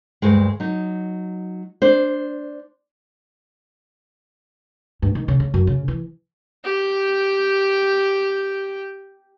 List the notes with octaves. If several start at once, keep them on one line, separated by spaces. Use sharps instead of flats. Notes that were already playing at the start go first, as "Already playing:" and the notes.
D2 G2 G#3
F#3 D#4
D4 C5
G2
D#3
C#3
C#3
F#2
C#3
E3
G4 G5